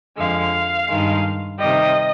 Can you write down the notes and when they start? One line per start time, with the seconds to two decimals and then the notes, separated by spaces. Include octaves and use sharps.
0.17 F2 D3 G#3 F5
0.88 G2 D#3 G#3
1.59 C3 D#3 G3 D#5